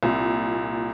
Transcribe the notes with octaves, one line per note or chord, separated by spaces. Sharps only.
C2 A#2